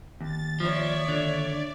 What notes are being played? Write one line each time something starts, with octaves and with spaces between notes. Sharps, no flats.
D#2 A6
F3 C#5 D5 E5
D3